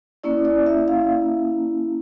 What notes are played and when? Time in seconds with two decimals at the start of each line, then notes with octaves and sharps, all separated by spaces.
0.24 A#3 C#4 E4 D5
0.45 D5
0.66 E5
0.88 F5